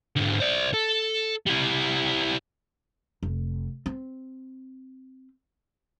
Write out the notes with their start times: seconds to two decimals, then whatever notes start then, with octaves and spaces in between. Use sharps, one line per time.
0.16 G#2 D3
0.40 C5 D5
0.74 A4
1.46 G3 E4
3.23 F1
3.86 C4